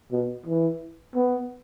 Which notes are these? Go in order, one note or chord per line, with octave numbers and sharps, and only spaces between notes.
B2
E3
B3